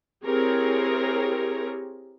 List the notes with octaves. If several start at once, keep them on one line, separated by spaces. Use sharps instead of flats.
C4 E4 G4 G#4 A#4 C#5